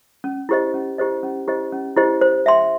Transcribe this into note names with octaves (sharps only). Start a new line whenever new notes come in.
C#4
E4 G4 C5 D#5
C#4
E4 G4 C5 D#5
C#4
E4 G4 C5 D#5
C#4
E4 G4 C5 D#5
C5
E5 G5 C6